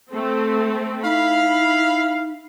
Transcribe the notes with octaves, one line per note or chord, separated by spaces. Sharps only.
A3 C4
D#4 E4 F5 B5